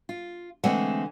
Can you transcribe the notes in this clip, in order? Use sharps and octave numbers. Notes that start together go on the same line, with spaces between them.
F4
D3 E3 G#3 A3 C4 F#5